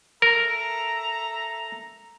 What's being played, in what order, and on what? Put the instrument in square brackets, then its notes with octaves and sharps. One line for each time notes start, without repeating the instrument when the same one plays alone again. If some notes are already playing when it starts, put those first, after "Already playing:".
[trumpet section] A4 E5 A#5 [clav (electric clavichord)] A#4